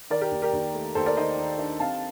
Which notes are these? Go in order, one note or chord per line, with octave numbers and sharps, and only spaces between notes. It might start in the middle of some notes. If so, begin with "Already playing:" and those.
D#3 A#4 D5
G4 A#4
D#2
G4 A#4
D#2
A3
D#2 A4 C5
A#4 D5
D#3 C5 D#5
D#3
D4
C4 F5 A5